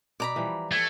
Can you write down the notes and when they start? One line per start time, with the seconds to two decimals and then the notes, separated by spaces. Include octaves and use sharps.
0.20 B2 D5 A#5 B5
0.36 E3 F3 G3
0.72 A3 G5 G#6